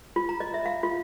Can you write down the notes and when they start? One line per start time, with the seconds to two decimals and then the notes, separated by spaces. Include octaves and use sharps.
0.16 F4
0.29 A#5
0.40 D#5
0.54 E5
0.66 F5
0.83 F4